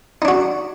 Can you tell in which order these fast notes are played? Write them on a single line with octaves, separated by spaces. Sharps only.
D#4 D4 F#4